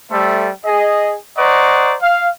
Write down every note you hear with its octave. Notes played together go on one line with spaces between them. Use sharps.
G3 A3 A4 C5 E5
G#4 D#5
C5 D5 D#5 F#5 A#5 C#6
F5